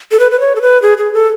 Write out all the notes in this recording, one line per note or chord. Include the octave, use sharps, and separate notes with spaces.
A4
B4
B4
C#5
A4
B4
G#4
G#4
A4